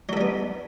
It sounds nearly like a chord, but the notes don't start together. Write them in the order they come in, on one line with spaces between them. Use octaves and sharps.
F#3 A4 G3 B3